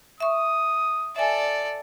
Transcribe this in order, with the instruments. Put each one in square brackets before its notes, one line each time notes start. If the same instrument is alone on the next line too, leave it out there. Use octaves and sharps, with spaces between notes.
[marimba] E5 C#6 [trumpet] D#6
[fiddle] A4 D5 [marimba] E5 G#5